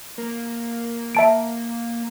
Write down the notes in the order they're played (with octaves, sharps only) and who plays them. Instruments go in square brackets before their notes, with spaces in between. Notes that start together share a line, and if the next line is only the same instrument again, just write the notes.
[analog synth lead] A#3
[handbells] E5 A5 D7